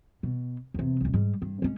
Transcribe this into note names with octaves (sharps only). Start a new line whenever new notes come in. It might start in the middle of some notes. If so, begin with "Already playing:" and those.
B2
E2 C3
D#1 C2
G#2 G3
G2
G#3 C#4